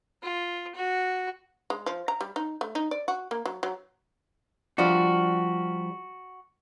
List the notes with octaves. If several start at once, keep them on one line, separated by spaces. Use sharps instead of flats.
F4
F#4
G#3
F3
A#5
G3
D#4
A3
D#4
D5
F#4
A#3
F#3
F#3
F3 G3 D4 F#4